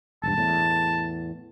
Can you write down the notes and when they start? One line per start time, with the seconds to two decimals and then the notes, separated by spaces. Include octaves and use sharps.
0.23 E1 G2 A5
0.37 E2 A2